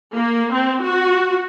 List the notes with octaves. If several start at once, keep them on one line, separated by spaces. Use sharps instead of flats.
A#3
C4
F#4